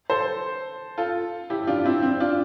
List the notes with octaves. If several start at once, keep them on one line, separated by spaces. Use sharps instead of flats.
A4 C5
F4 A4
E4 G4
D4 F4
C4 E4
C4
D4 F4